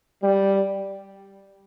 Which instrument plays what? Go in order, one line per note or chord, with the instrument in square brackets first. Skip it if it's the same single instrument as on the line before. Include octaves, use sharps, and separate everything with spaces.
[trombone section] G3